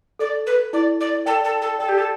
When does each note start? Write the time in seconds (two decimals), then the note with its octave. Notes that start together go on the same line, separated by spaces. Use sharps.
0.19 A4 D5
0.46 B4
0.72 E4 D5
1.00 D5
1.25 A4 D5 G5
1.44 A4
1.61 A4
1.79 A4 D5 G5
1.88 G4
1.97 A4